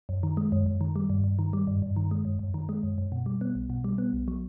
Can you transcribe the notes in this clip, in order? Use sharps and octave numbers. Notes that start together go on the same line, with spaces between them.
F#2
D#3
G#3
F#2
F#2
D#3
G3
G2
G2
D#3
G3
G2
G2
D#3
G#3
F#2
F#2
D#3
G#3
F#2
F#2
B2
G3
B3
B1
B2
G3
B3
B1
F#3